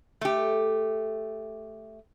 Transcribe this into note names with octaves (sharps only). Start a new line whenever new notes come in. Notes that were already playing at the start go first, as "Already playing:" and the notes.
A3 G4